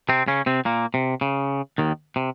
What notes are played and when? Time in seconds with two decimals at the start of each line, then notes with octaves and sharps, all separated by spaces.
0.09 C3 C4
0.28 C#3 C#4
0.46 C3 C4
0.65 A#2 A#3
0.94 C3
1.21 C#3
1.78 D#2 D#3
2.16 C3